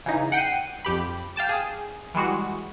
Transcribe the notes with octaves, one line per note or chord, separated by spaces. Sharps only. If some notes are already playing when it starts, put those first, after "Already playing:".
C#3 E3 D#4
F#5 G5 G6 C7 D#7
F2 G4 B5
F5 G5 A5 D6
G#4
E3 G3 G#3 F#4